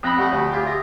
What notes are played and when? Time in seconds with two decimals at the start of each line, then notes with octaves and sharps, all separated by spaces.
0.03 F2 G5 B5 D#6 F#6 A#6
0.18 G3 A3 G4 F#5
0.32 D2
0.52 F4 G#4
0.66 E5 A#6